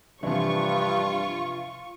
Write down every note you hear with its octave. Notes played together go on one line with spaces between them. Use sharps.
G2 C3 E3 F3 D4 F4 C#6